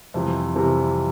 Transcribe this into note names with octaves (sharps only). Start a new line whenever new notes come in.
F2 C3 E3 G3
F2 C3 E3 G3